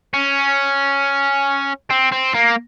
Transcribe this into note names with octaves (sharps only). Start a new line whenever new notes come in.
C#4
C4
C4
A#3